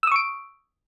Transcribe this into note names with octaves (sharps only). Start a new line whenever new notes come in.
C#6 D#6 E6 D7